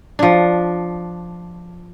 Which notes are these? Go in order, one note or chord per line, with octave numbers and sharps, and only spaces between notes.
F3 D4